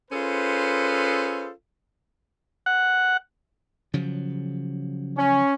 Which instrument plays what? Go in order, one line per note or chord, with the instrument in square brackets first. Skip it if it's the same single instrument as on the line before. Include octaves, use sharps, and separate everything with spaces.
[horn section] C#4 F4 G#4 A4 B4 C5
[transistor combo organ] F#5
[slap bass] C#3 F3 F#3
[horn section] C#4